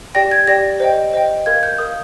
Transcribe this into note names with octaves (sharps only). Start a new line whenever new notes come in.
G4 D5 G5 A#6
G#6
G4 D5 G5 A#6
C5 D#5 G5
C5 D#5 G5
A#4 F5 G#6
G6
A#4 F5 D#6